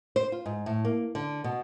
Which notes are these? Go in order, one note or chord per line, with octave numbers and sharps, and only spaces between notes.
C5
F4
G#2
A2
A#3
D3
B2